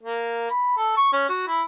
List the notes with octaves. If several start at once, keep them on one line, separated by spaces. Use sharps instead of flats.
A#3
B5
A4
C#6
C#4
F#4
E4